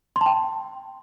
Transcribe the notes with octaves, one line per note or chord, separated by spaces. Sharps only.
C6
A5
G5